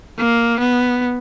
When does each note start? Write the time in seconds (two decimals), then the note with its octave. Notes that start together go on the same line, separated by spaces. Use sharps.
0.18 A#3
0.59 B3